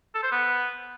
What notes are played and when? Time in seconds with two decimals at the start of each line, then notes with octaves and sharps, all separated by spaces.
0.15 A4
0.23 C5
0.31 B3